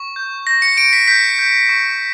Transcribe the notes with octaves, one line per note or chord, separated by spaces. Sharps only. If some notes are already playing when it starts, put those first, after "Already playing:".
Already playing: C#6
G6
G6 A#6
C#7
C#6 D7
B6
G6 B6
G6
C#6